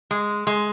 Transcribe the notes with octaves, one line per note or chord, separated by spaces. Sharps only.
G#3
G#3